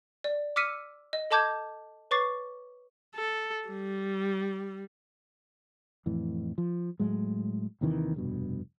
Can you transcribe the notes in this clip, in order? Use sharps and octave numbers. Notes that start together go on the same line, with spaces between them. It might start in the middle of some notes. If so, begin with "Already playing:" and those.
D5
D6 E6 F6 B6 C#7 D#7
D#5
A4 D#5 A5 D6 G6 G#6
B4 C#5 C#6 D6 A6 C7
A4
G3
F2 A2 E3
F3
A2 F#3 G#3
D#2 C3 D#3 E3
F1 G2 B2